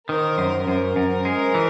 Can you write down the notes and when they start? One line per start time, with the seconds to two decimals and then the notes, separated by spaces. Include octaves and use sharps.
0.09 D#3 A#4 C5
0.38 F#2
0.67 F#2 A#4 C5
0.96 F#2
1.25 G#3
1.54 E3